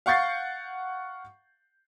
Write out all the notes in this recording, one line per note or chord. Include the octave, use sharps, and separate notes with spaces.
F5 F#5 C#6 G6 A6 C7